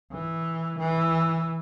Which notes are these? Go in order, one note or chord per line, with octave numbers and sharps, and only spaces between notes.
E3
E3